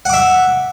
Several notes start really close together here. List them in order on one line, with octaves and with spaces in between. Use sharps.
F#5 D6 E5